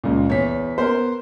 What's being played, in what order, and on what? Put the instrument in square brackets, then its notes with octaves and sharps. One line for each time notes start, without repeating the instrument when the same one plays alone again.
[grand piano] C#2 A#2
[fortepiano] E2 [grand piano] C#5 B6
[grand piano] B3 [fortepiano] A#4 C5